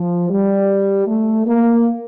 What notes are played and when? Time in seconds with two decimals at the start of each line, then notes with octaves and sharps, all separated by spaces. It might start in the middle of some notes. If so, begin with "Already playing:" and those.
Already playing: F3
0.30 G3
1.07 A3
1.46 A#3